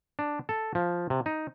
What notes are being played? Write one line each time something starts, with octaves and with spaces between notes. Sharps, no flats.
D4
A4
F3
C3
D#4